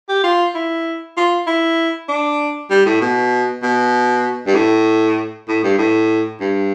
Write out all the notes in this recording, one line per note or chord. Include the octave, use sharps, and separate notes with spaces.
G4
F4
E4
F4
E4
D4
G3
A2
B2
B2
G2
A2
A2
G2
A2
G2